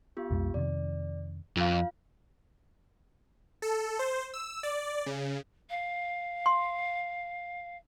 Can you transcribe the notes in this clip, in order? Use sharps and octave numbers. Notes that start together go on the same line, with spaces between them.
B3 F4 G4
B1 F2 G#3
F2 C3 D#3 D5
F2 F4 F5
A4
C5
E6
D5
C#3
F5
C6